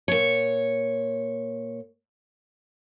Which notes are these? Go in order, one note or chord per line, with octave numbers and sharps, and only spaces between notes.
A#2 C#5